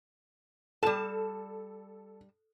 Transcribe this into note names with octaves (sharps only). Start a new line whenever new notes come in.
G3 A4 A5 E7